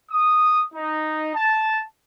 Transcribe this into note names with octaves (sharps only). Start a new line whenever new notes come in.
D#6
D#4
A5